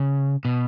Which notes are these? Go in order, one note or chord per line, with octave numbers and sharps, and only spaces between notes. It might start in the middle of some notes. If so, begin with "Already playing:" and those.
Already playing: C#3
B2